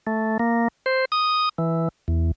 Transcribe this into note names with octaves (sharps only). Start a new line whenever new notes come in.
A3
A#3
C5
D#6
E3
E2